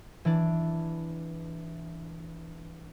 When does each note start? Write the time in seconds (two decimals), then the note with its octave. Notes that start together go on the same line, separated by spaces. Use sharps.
0.25 E3 D4